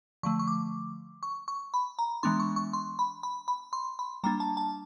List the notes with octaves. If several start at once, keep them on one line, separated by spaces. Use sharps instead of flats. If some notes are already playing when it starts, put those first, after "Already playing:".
D3 F3 A3 C#6
C#6
D6
C#6
C#6
B5
A#5
E3 G#3 B3 D4 C6
C#6
C#6
C6
B5
B5
B5
C6
B5
G3 A#3 D4 A#5
A5
A5